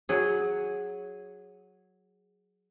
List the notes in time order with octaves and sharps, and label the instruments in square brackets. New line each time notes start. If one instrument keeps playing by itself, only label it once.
[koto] F#3 G#4